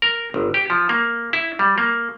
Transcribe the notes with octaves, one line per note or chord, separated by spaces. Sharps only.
A#4
G1
G4
F3
A#3
E4
G3
A#3